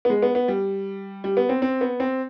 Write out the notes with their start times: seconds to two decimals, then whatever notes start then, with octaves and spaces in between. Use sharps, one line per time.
0.05 B3
0.10 G#3
0.22 B3
0.35 B3
0.48 G3
1.24 G3
1.37 B3
1.49 C4
1.62 C4
1.81 B3
2.00 C4